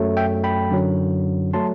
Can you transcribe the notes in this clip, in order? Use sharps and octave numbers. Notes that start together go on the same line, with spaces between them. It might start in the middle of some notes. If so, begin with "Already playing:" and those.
Already playing: F#2 F#3 A3
E5 G5
G5 B5
F#2 D3 F#3
F#3 A3 A5 C6